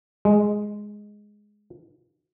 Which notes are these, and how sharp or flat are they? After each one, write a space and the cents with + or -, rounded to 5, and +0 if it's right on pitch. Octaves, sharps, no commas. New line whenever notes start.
G#3 +0